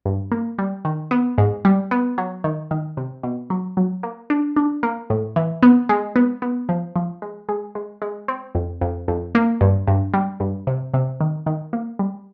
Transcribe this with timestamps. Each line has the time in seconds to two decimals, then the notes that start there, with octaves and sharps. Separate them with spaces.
0.05 G2
0.32 A#3
0.58 G3
0.85 D#3
1.11 B3
1.38 G#2
1.65 G3
1.91 B3
2.18 F#3
2.44 D#3
2.71 D#3
2.97 C3
3.23 B2
3.50 F#3
3.77 F#3
4.03 A#3
4.30 D4
4.56 D4
4.83 A#3
5.10 A2
5.36 E3
5.63 B3
5.89 G#3
6.16 B3
6.42 B3
6.69 F3
6.96 F3
7.22 G#3
7.49 G#3
7.75 G#3
8.02 G#3
8.28 C4
8.55 F2
8.81 F2
9.08 F2
9.35 A#3
9.61 G2
9.87 G2
10.14 G3
10.40 G2
10.67 C3
10.94 C3
11.21 D#3
11.46 D#3
11.73 A#3
11.99 G3